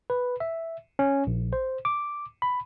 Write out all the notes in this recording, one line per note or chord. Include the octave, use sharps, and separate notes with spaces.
B4
E5
C#4
A#1
C5
D6
B5